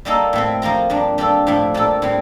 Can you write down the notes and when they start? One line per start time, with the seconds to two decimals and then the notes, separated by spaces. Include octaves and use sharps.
0.05 G3 A#3 D#4 A4
0.33 A2 A3 C4
0.62 F3 A#3 F4 A#4
0.90 G2 F3 A#3 D4
1.18 G3 D4 F4 A4
1.47 A2 F3 A3 D4
1.74 A#2 G3 D4 A4
2.02 A2 G3 C4